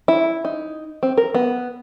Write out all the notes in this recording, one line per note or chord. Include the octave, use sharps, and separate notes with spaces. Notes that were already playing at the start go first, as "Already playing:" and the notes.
E4
D#4
C4
A#4
B3